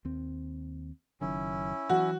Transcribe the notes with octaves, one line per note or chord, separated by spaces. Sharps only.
D#2 C4
F#1 F#2 D#3 C#4 E4
E3 F#3 F#4